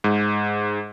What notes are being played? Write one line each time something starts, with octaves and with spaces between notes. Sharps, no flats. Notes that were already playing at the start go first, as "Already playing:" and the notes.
G#2